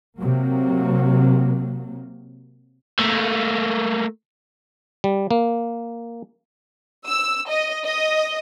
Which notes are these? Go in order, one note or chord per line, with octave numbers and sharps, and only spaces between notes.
C3 F#3 A#3
A3 A#3
G3
A#3
E6
D#5
D#5